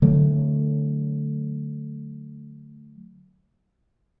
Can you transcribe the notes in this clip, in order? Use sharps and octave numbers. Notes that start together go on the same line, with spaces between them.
D3 F#3 A3